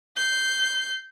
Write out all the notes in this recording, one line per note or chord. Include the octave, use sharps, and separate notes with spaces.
G6 C7